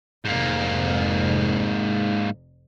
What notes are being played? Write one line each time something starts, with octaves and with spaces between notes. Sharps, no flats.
F1 F2 G#2 A#3